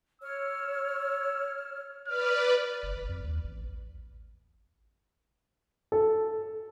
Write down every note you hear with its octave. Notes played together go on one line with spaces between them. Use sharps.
C#5 E6 F6
B4 D5 F6
F#1
G#1
F2
D#2
A1
A4